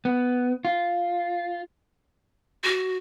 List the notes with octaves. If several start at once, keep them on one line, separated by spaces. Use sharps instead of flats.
B3
F4
F#4